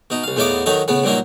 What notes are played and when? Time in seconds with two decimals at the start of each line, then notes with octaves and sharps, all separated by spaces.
0.10 B2 D#4
0.23 C2 F5
0.36 E2 A2 B3 D#4 F5 D6
0.66 D#3 F#3 D#4 A4
0.88 A2 C#3 B3
1.04 G2 A#2 F#3 A#3 D#4